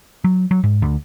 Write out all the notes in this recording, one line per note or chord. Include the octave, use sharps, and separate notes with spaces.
F#3
F#3
G#2
D2